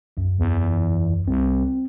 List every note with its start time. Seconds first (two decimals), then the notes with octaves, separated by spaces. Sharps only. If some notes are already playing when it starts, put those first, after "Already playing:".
0.17 B1 F#2
0.39 E2
1.28 C2 C4